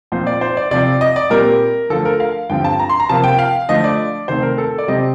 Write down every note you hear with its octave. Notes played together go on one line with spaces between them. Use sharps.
A#2 F3 C4 C5
D5
C5
D5
C3 F3 C4 D5
D#5
D5
A#2 G3 C4 A#4
D3 F3 A3 A4
A#4
F5
G2 D3 F3 C4 G5
A5
A#5
C6
A#5
C3 F3 A#3 A5
G5
F5
D3 F3 A3 D#5
D5
C3 D#3 A3 C4 C5
A#4
A4
D5
C3 G3 C4 D#5